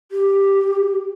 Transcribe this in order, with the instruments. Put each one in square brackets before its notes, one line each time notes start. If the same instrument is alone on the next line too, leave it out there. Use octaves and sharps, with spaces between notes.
[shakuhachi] G4